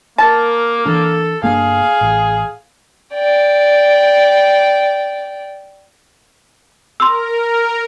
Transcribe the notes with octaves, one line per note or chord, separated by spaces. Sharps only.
A#3 A#4 A5
E3 D4 A4
G1 A#3 D4 G#4 F5
A1
D5 G5
A#4 C6 E6